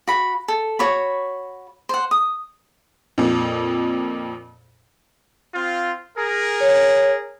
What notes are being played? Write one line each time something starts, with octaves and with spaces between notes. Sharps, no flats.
F#4 B5
A4
F#4 C#5 B5
C5 F#5
D#6
F2 A#2
C4 F4
G#4 A#4
C#5